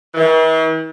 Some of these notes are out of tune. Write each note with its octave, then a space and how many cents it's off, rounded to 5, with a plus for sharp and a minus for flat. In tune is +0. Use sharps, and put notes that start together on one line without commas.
E3 -45